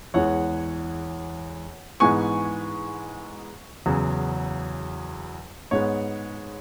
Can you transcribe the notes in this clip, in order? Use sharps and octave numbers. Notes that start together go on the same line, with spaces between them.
E2 E3 G#3 C#5 F#5
G#2 E3 G#3 B3 G#5 C#6
E2 C#3 F#3
G#2 G#3 B3 C#5